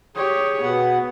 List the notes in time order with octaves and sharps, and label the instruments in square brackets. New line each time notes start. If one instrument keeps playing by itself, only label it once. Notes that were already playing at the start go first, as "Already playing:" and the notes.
[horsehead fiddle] G4 C#5 [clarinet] G#4
[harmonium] B2 F#5 [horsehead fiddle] B3